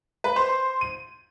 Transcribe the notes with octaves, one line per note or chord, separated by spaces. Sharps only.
B4
C5
D#7